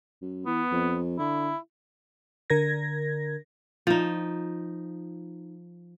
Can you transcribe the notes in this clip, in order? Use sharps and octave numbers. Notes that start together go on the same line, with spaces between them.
F#2
E3 B3
F2
D3 E4
D3 A#4 G#6 A#6
F3 D#4